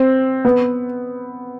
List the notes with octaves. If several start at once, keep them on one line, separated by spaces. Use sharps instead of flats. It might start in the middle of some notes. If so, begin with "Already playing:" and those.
Already playing: C4
B3